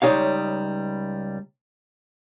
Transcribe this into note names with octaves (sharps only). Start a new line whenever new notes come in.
C#2 G3 D#4 C#5 F5